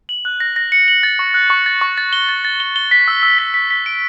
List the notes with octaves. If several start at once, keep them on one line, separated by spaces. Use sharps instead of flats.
F#7
F#6
A#6
A#6
C#7
F#7
A6
C#6
F#6
C#6
A6
C#6
A6
G7
A6
A6
G7
G7
B6
E6
E6
B6
B6
B6
D7